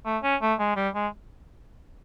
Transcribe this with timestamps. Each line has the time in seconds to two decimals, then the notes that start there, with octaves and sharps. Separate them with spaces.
0.06 A3
0.23 C#4
0.42 A3
0.60 G#3
0.76 G3
0.95 G#3